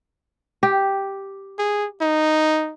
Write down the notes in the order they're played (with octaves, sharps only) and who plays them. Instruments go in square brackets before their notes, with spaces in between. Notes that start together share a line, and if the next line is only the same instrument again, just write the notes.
[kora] G4
[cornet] G#4
D#4